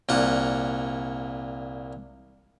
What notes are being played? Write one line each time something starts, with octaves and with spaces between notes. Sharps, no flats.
C2 A#2 F#5